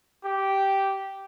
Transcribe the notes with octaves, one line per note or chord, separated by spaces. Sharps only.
G4